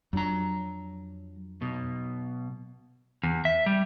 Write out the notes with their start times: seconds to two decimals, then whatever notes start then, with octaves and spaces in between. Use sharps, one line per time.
0.13 F2 F#3 D4 A#5
1.61 B1 B2
3.23 E2
3.45 E5
3.66 G3